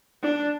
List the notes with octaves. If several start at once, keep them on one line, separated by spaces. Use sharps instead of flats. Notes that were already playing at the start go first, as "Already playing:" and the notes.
D4